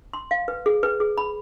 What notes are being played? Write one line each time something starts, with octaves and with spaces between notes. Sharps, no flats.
C6
F5
B4
G#4
B4
G#4
B5